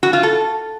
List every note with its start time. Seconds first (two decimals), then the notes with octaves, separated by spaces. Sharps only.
0.03 F#4
0.13 F4
0.23 A4